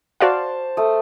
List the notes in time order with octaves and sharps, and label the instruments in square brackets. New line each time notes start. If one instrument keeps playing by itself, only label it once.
[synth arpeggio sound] F#4 D5 F5 [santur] C5 A5
[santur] A3 D#6